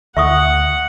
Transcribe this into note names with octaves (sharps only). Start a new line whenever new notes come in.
D2 E5 F#5 C#6 D#6